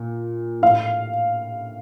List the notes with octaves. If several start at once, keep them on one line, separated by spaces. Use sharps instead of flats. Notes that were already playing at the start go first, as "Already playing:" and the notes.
Already playing: A#2
A2 F5